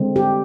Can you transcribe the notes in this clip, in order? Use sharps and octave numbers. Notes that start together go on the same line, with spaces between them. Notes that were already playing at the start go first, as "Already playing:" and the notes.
Already playing: D3 G#3 C4
G4